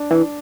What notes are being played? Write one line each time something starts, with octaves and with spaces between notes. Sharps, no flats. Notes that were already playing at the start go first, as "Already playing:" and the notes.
Already playing: D4
E3